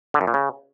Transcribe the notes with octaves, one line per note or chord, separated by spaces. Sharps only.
D3
F#2
A#2
C#3